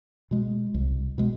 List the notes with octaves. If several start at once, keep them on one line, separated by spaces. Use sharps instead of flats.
B2 G#3
C2
B2 G#3